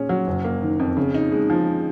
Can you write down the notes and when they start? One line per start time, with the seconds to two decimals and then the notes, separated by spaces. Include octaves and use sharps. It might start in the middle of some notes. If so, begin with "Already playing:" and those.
Already playing: A#2 C#4 G#4
0.09 F#3
0.27 F#1
0.44 A#3
0.62 D#3
0.79 F2
0.97 C#3
1.14 D#4
1.32 G#3
1.50 F3